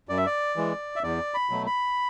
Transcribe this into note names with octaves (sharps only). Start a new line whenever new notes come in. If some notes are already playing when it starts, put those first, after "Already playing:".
F#2 D5
E5
D5
E3 G#3
E5
E2 D5
B5
B2 F#3 A3
B5